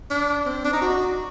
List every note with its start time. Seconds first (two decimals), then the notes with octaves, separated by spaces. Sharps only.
0.10 D4
0.46 C4
0.65 D4
0.73 D#4
0.82 F#4